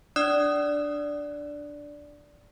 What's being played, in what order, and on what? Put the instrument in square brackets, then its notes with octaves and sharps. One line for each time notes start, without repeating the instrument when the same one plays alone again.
[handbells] D4 D5 D#6 F#6